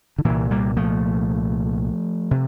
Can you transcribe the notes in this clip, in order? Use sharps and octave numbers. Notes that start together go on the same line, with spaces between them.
D3
C2 A#2 E3
G3 A#3
F3 A3
C3